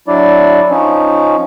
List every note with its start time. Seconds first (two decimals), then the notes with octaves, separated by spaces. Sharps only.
0.08 F#3 D4 E4 D5
0.70 F3 C#4 D#4